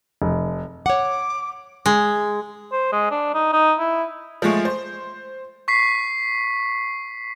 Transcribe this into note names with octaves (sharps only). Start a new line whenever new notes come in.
F1
C#5 F#5 D6
G#3
C5
G#3
D4
D#4
D#4
E4
F3 G#3 A3
C5
C#6 B6 C7